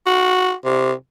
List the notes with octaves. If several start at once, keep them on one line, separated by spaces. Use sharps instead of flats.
F#4
C3